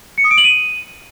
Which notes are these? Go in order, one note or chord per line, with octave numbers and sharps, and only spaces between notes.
C#7
D#6
D7
F#7
D#7